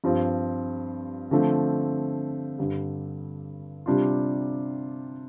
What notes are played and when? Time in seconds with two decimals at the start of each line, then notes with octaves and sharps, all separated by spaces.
0.04 G2 F3 C4 F4
1.31 D3 F3 A3 C4
2.58 G2 D3 G3
3.86 C3 G3 D4 F4